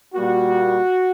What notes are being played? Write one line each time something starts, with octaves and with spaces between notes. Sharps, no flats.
A#2 G3 A#3 F#4